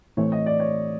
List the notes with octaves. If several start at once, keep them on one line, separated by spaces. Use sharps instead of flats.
A2 E3 A3 C4 C#5
D#5
D5
C#5